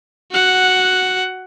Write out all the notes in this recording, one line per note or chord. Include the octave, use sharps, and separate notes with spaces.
F#4 F#5